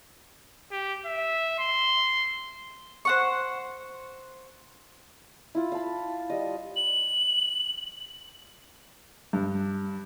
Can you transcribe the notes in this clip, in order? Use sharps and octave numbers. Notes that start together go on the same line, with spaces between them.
G4
E5
C6
C5 F#5 C#6
E4 F4
F5 A5 B5
G3 D#5
F#7
G2